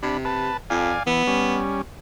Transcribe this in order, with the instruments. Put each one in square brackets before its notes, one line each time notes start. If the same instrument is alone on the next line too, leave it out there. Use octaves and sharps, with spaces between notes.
[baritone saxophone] C3 [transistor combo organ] D4 B5
[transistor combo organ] B4 A5
[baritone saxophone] F2 [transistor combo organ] D5 F5 G#5
[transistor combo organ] E3 [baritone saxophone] B3
[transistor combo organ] G3 C#4